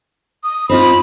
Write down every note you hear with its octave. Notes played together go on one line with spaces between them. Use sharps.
D#6
C4 D#4 F4 B5